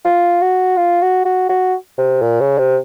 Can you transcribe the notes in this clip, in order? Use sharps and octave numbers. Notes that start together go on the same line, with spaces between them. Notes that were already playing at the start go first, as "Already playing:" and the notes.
F4
F#4
F4
F#4
F#4
F#4
C3
A#2
C#3
C3